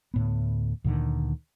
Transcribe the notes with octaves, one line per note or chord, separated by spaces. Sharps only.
D2 A2 B3
D2 A#2 D3 D#3